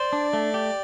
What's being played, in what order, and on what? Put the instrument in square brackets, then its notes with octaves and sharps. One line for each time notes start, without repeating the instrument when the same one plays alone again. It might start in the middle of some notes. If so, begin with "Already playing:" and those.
Already playing: [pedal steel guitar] C5 [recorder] D5
[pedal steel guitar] D4
A3
G4